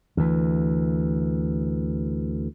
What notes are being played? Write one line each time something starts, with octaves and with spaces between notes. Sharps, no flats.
D2 E3